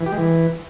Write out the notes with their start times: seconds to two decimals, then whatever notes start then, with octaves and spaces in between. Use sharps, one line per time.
0.01 E3
0.06 G4
0.12 G#3
0.18 E3